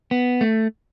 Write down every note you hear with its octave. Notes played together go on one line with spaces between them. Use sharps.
B3
A3